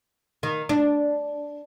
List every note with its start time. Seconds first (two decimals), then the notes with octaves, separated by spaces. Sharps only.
0.43 D#3
0.69 D4